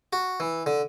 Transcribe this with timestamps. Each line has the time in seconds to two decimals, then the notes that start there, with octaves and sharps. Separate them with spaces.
0.13 F#4
0.40 E3
0.66 D3